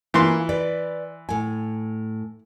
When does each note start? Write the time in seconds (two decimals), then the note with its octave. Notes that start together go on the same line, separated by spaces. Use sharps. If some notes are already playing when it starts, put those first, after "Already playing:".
0.14 E3 A#3 C#4 F4 C6
0.49 B4 D5
1.29 A2 G#5